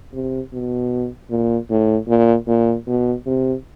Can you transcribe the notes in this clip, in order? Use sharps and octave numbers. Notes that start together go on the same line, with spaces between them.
C3
B2
A#2
A2
A#2
A#2
B2
C3